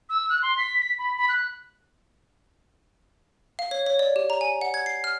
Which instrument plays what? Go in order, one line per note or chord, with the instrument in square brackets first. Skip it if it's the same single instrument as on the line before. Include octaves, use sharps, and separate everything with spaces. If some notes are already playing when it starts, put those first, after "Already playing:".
[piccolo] E6
F#6
C6
B6
B6
B5
B5
F#6
[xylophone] F5
C#5
C#5
D5
G4
A#5
G#5
F#5
G#6
C7
F6